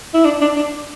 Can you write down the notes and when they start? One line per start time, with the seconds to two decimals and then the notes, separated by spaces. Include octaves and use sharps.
0.14 E4
0.25 D4
0.41 D4
0.56 D4